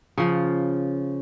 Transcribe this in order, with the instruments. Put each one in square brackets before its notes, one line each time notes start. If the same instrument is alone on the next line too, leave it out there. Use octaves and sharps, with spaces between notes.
[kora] C#3 F3